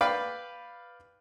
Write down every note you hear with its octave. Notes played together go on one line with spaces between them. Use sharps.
B4 D5 F5 G5 B5